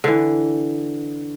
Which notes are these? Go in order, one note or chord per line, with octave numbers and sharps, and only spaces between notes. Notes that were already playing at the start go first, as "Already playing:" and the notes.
D3 E3